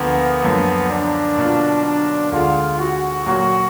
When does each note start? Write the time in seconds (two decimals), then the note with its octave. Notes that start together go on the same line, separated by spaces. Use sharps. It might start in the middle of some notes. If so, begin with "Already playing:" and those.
Already playing: D2 D3 F3 A#3 B3
0.42 F#2 D3 F3 A#3
0.90 D4
1.38 B2 A#3 F4
1.84 D4
2.32 D2 D3 G#3 F4
2.79 F#4
3.26 A#2 F#3 A#3 F#4